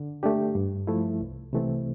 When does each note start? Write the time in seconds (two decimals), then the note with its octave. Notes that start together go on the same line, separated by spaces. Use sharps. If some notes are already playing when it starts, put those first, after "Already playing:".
Already playing: D3
0.23 A3 D4 G4
0.55 G2
0.87 F3 A3 E4
1.21 C2
1.53 C3 E3 A3 C4